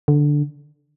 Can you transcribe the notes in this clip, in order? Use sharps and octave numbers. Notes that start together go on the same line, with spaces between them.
D3